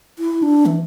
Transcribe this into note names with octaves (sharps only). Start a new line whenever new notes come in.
E4
D4
E3